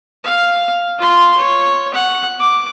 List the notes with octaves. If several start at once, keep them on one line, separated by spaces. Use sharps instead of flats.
F5
F4 C6
C#5
F#5
D6